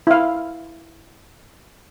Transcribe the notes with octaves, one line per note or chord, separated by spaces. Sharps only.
E4 F5